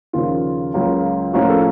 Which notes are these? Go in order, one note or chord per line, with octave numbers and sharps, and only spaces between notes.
D#2 C#3 F3 F4
C#2 C#3 F#3 A#3
A2 F3 A#3 C#4 F#4
A4